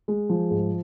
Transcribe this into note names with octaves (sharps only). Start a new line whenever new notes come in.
G#3
F3
G#2